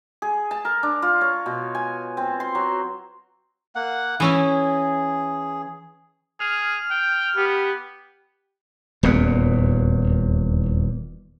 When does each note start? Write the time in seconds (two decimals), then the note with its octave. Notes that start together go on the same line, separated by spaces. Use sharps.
0.22 G#4
0.51 A5
0.65 A#4
0.83 D4
1.02 F4
1.21 C#5
1.46 B2
1.75 G#5
2.17 C4
2.40 C6
2.55 F#3
3.75 A#3 F#5
4.20 E3 C#4 E4 G#4
6.40 G#4 F6
6.90 G5
7.37 B3 G4
9.03 D#1 E2 A#2 B3